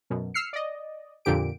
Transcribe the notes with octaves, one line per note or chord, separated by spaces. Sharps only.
F#2 B2
E6 F6 C7 C#7
D5 D#5
F2 A#2 D3 G4 D7